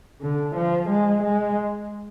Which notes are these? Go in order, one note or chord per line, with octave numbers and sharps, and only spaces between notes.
D3
F3
G#3
G#3